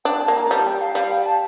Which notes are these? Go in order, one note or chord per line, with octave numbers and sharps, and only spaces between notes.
D4 G5
A5
A#3
A#5
G3 A5
G5
F5
G3 F5
G5
A5